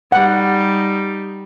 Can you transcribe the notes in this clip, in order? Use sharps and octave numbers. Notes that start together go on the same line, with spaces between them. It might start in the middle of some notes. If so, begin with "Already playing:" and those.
G3 D#4 F#5